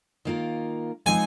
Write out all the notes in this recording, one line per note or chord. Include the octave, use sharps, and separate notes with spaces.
D#3 A#3 F4 A#4
F3 G#3 C4 D#4 G#4 G#5